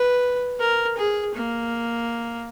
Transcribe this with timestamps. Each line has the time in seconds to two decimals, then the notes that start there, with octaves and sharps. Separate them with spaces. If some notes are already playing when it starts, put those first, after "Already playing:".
Already playing: B4
0.60 A#4
0.97 G#4
1.34 A#3